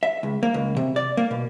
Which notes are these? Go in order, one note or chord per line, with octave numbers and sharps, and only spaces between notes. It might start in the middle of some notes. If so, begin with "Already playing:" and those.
E5
C#2
A#3
C#2
C3
D5
A#3
B2